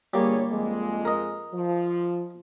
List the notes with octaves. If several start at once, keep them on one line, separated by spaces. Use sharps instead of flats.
G1 G3 A#3 G#4 C#5
F2 F3 G#3
A#4 D#5
F3